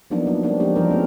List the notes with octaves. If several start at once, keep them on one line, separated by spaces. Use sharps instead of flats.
F3 F#3 A#3 B3 D4 D#4
F#3
G3 G#3 A#3 C4 D4
F3 G#3 C4 D4 G4
E3 F3 G3 D4 A#4
A3 B3 C#4